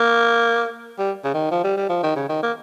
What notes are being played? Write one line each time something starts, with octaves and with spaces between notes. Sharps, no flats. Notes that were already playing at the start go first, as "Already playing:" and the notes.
Already playing: A#3
G3
C#3
D#3
F3
G3
G3
F3
D#3
C#3
D#3
A#3